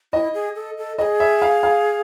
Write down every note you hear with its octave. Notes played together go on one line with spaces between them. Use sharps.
E4 D#5
G#4
A4
A4
G#4 A4 D#5
E5
F5
F5